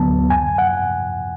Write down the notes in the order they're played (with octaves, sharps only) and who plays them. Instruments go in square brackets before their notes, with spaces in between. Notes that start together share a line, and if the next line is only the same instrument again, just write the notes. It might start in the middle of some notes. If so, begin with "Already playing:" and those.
Already playing: [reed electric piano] D2 D3 F#3 B3 A5
F#2 G#5
F#5